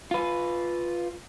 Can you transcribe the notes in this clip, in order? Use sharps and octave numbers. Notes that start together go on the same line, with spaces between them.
F4 B4